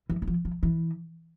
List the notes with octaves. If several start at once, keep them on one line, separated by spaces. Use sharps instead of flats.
E3
E3
F3
F3
E3